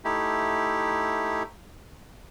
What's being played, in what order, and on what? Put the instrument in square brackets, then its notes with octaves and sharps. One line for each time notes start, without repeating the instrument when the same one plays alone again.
[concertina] A3 D#4 E4 G4